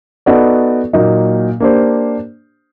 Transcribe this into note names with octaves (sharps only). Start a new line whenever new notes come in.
B3 D#4 F#4 A4 D5
A#2 F#3 A#3 D#4
A#3 D4 G4 C5